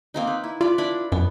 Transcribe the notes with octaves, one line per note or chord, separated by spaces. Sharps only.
A#3 C4 D#4
B4
E4
F4 B4 D5
D4 E4 B5
F#2 B3